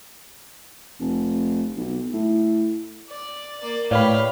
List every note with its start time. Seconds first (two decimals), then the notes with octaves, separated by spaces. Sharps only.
1.00 F1
1.76 B1
2.13 A2
3.09 D5
3.60 A#3 D5
3.91 A2 G4 B4 C#5 D5 F5 B5